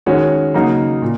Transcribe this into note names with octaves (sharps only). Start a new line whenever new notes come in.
D#3 G#3 C#4 F#4 C#5
C#3 F#3 A#3 D#4 F#4
A#2